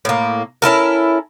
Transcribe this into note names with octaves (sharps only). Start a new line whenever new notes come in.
A2 A#3
C#4 E4 A4 A#4